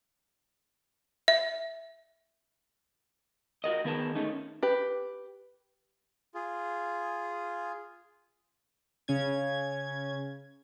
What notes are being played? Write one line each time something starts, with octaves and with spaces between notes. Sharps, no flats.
E5
F4 F#4 A#4 D#5
D#3 B3 G#4 A#4 F5 A5
A3 C#4 D#4
G4 B4
F4 G#4
C#3 C#4 G#6